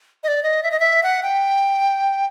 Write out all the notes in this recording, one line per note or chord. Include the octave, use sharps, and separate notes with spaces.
D#5
D5
D#5
E5
D#5
E5
F#5
G5